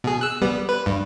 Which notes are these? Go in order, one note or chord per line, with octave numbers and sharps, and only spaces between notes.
B2 G#4
E6 F#6
G3 B3
B4
G2